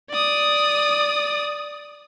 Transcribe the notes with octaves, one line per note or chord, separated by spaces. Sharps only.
D5 D#6